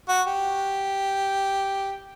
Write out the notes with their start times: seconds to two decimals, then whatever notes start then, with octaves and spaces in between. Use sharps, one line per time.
0.09 F#4
0.27 G4